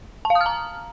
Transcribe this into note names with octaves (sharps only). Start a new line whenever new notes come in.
A5
F5
D#6
F6
A#5